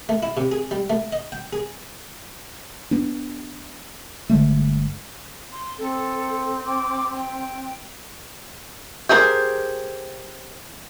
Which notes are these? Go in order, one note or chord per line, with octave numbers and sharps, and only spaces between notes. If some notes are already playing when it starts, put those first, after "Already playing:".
A3
E4
C3
G#4
G3
A3
D#5
G5
G#4
B3 D4
G1 D3 G#3 A3
C6
C4 A4
D6
G5
G4 G#4 A#4 C5